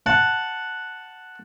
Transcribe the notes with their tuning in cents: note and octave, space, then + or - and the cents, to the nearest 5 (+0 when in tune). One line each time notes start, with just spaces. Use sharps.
F#5 +0 A5 +0